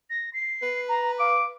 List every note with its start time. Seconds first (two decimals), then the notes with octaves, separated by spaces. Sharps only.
0.10 A#6
0.33 C7
0.62 B4
0.89 A#5
1.19 F5 D6